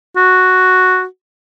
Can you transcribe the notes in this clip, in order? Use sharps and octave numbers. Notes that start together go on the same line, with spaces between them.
F#4